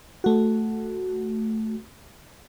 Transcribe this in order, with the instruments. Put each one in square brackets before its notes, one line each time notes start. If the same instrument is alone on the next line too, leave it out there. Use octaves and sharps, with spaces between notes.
[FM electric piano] A3 F#4